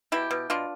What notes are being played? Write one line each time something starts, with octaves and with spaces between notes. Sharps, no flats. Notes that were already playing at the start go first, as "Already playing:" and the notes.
B2 E4 G4
B2
B2 D4 F4